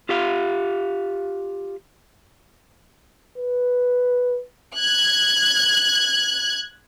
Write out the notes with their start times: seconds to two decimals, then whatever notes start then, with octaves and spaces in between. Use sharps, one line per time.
0.09 F4 G4 F5
3.38 B4
4.76 F#6 G#6